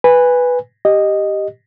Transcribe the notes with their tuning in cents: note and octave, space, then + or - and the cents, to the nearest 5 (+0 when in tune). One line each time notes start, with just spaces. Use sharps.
B4 +0 G#5 -15
G4 +0 D#5 -5